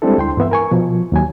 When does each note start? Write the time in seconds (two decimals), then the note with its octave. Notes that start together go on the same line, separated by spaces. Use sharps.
0.02 G3 G#3 C4 D4 E4 A4
0.18 D2 G5 C6
0.37 G2 E3 B3 E5
0.51 A#4 G#5 C#6
0.71 B2 F3
1.12 D#2 F#3 G#5